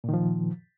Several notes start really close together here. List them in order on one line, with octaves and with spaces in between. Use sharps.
A#2 D#3 F3